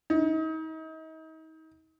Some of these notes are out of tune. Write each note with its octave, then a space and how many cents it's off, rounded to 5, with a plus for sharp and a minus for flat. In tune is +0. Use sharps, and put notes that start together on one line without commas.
D#4 +35